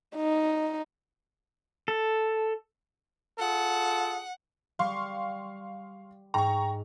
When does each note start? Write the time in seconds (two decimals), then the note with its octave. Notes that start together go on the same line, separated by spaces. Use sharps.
0.16 D#4
1.88 A4
3.39 F4 G#4 A4 F#5
4.79 G3 F5 C6 C#6
6.34 G#2 G5 A#5 C#6